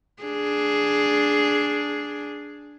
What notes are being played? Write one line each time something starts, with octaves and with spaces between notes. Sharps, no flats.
D4 G#4